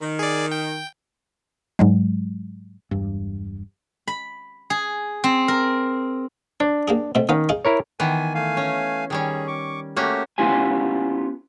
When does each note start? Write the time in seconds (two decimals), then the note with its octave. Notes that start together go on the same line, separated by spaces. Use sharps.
0.02 D#3
0.19 G#4 D5
0.52 G5
1.79 G#2 F#3 G#3
2.91 E1 G2
4.08 B5
4.70 G#4
5.24 C4
5.48 A#4
6.60 D4 C#5
6.88 A#3 G4 G#4
7.15 B2 A3 C4
7.29 D#3 B3 C#4 F5
7.49 D#4 G#4 F5
7.65 E4 A#4 C#5
8.00 D#3 E3 B3 G#5
8.35 A3 F5 G#5
8.57 C#4
9.10 D#3 G3 C#4 G#4
9.47 C#6 D6
9.96 A3 A#3 C#4 F#4 G4
10.38 B3 C#4 E4 F4 G4 G#5